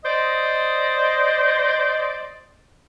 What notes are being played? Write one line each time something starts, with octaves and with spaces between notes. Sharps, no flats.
C5 D5 D#5